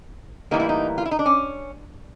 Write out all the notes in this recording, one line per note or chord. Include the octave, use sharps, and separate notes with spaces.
A2 E3 G3 A#3 D#4
E4
D#4
F4
E4
D#4
D4
C#4